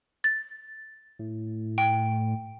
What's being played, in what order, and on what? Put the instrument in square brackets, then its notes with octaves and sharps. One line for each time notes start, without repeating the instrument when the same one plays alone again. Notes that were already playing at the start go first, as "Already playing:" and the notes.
[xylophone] A6
[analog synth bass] A2
[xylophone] G5